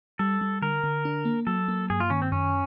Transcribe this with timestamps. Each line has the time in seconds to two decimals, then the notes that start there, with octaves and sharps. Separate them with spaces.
0.19 G3 A4
0.41 G3
0.62 D3 A#4
0.84 D3
1.05 D4
1.25 A#3
1.47 F#3 A4
1.68 A#3
1.90 G2 G#4
2.00 F4
2.10 D#3 C#4
2.22 C4
2.32 F#2 C#4